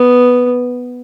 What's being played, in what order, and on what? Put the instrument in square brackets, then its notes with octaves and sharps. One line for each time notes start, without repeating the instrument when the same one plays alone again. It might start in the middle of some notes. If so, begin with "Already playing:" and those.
Already playing: [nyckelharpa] B3